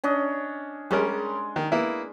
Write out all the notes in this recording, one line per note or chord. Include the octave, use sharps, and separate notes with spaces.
C#4 D4 D#5
G3 G#3 C#4 A#4
D#3
A#3 B3 E4